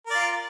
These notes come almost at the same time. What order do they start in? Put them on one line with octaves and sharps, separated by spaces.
A#4 D5 F4